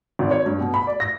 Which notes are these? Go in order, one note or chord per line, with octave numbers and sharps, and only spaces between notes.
G#1
C#5
G2
B2
B5
D5
A#6